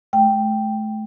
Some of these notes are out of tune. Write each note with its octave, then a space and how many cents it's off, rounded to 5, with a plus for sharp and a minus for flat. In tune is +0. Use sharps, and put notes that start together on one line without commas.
A3 -35 G5 +0